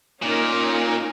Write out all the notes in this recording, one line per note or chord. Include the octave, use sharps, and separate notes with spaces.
A#2 C#4 D#4 A#4